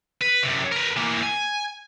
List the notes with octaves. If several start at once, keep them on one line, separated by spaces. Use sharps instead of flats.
B4
F#2 C3
A#4 B4
E3 A#3
G#5